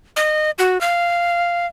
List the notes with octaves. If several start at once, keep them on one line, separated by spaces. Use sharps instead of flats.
D#5
F#4
F5